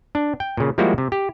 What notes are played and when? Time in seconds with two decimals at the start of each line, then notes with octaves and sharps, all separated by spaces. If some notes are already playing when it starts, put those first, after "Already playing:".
0.15 D4
0.40 G5
0.57 A#2 C#3
0.78 F3 G3 G#3 A#3 E4 F#4
0.98 C3
1.12 G4